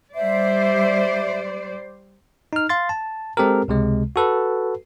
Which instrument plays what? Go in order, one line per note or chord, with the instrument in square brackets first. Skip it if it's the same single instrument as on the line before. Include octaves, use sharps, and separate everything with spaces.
[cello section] G3 C5 D5 [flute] E5
[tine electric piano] D#4 F6
F5 C6 A6
A5
G#3 C4 G4 A4 A#4
C#2 C3 G#3
F#4 A4 B4